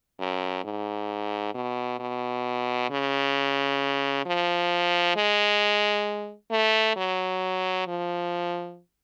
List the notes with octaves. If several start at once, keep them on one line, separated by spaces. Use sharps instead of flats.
F#2
G#2
B2
B2
C#3
F3
G#3
A3
F#3
F3